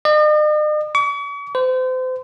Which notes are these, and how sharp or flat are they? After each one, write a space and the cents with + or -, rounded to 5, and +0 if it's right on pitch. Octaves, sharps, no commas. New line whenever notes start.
D#5 -45
C#6 +45
C5 -35